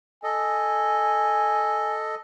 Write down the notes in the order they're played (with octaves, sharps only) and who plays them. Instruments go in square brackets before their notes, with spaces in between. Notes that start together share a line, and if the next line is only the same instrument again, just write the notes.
[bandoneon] A4 D#5 [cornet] G#5